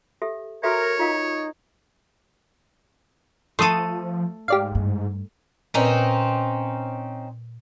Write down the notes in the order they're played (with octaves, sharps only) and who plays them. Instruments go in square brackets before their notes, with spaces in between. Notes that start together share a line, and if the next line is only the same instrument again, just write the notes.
[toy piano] G4 A4 E5
[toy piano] F#4 A4 E5 [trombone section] A#4 [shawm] C#5
[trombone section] D#4 [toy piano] F4 A#4 F5
[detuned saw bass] F3 [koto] A3 A4 [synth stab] C6 D#6 D#7
[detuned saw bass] G#2 [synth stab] G4 D5 F5
[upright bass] G2
[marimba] A#2 B4 [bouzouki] C4 C#4 D#4